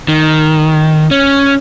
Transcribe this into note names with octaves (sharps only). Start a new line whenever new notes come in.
D#3
C#4